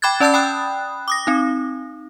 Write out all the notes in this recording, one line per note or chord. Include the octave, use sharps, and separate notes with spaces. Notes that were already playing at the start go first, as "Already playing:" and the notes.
G5 B5 D6 F#6 G#6 A6
C#4 D5 A5 E6 G6 A6
G5 B5 D#6 F#6
D6 D#6 A#6
C4 D#4